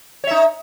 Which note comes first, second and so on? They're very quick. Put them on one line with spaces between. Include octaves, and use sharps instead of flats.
C#5 E5 D#4